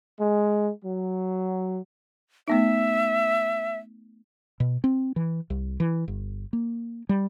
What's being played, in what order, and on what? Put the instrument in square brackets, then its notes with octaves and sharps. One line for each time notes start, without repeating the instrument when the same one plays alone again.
[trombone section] G#3
F#3
[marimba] A3 B3 D#4 [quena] E5
[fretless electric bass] B2
C4
E3
C2
E3
G1
A#3
G3